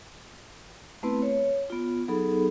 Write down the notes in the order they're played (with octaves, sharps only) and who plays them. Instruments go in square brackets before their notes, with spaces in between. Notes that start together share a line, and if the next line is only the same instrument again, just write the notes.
[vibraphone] A3 B3 C4 E4 B4
C#5
B3 F4
F#3 B3 D#4 G#4 A4 B5